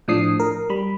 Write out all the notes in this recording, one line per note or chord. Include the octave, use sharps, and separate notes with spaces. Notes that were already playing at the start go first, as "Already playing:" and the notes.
A2 F3 D4 D#6 C7
A#4
G3 B5